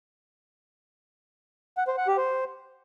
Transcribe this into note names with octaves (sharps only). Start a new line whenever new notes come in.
F#5
C5
F#5
G4
C5